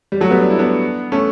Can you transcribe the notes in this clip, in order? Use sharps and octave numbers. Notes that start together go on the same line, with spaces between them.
G3
F#3 A3
G3 B3
D4
E4
B3 D4
A3 C#4